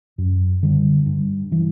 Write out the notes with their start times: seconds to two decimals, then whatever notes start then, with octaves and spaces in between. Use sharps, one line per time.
0.18 F#2
0.63 D3 G3
1.06 G2
1.51 E3 G3